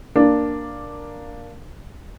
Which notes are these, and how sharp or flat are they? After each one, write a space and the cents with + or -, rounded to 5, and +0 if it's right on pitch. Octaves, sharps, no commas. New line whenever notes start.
A#3 +0 D4 +0